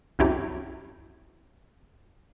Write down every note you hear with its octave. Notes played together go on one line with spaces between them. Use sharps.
C2 F#2 E4 G4